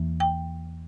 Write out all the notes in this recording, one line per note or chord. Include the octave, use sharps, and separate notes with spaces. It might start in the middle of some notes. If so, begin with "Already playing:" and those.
Already playing: E2 E3 A#3
G5